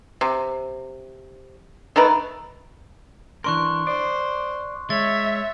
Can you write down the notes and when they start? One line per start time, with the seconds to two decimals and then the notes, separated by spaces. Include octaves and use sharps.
0.21 C3
1.96 D#3 A3 A#4 B4
3.44 E3 D4 A#4 C6 C#6 F#6
3.87 C5 D5
4.90 G#3 C#5 E5 A6